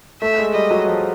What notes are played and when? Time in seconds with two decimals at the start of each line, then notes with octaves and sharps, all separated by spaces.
0.22 A3 E5
0.38 G#3
0.54 G3 D#5
0.70 F#3
0.87 F3